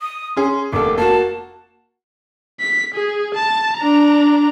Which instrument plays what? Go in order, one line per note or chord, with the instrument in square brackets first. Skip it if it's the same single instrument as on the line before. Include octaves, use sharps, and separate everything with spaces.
[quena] D#6
[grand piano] C#4 G#4 [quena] C6
[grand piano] F1 A#3 A4 [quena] D6
[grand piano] A#3 F#4 [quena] A5
[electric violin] B6
G#4
A5
D4 A#5